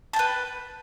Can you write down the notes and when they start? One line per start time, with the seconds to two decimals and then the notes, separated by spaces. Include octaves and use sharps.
0.13 A5
0.16 G5
0.19 B4